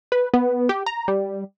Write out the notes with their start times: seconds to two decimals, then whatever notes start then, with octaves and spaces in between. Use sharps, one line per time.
0.12 B4
0.34 B3
0.69 G4
0.86 A#5
1.08 G3